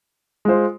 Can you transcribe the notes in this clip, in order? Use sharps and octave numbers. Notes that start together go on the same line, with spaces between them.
G#3 F4 C5